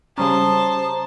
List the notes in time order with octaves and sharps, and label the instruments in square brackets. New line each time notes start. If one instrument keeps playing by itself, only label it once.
[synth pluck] C#3 G3 C#4 [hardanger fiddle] C5 A5 [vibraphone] A#5 [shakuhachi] D#6